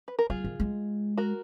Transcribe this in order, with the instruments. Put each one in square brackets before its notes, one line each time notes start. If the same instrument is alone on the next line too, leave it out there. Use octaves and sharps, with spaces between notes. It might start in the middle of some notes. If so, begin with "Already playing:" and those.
[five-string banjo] B4
A#4
[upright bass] F#3 [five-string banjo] F4 G#4
[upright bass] D#3
G#3
[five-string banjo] F#4 A#4